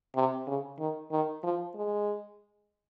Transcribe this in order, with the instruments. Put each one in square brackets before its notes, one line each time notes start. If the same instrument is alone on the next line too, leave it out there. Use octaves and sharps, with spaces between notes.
[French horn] C3
C#3
D#3
D#3
F3
G#3